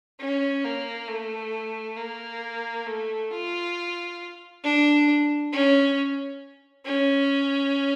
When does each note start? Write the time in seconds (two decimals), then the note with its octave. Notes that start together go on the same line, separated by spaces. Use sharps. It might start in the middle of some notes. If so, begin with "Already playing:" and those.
0.20 C#4
0.64 A#3
1.08 A3
1.97 A#3
2.86 A3
3.30 F4
4.63 D4
5.52 C#4
6.85 C#4